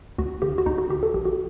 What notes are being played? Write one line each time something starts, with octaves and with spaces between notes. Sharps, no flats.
D2 F#4
D3 G4
F#4
D2 D#4
F#4
D3 G4
A4
A#1 G4
F#4